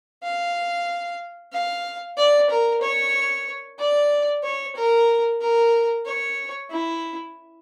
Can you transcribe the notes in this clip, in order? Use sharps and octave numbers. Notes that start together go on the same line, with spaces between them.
F5
F5
D5
A#4
C#5
D5
C#5
A#4
A#4
C#5
E4